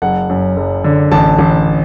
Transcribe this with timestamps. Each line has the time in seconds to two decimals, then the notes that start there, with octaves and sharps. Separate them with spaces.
0.02 F#1 F#5
0.29 F#2
0.56 F#1
0.84 D3
1.12 A1 A5
1.39 A1